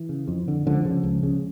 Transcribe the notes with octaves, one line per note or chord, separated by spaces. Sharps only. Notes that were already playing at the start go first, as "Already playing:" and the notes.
Already playing: E3
C#3
F2
D3
C#2 D3 F3
C#3
C#2
C#3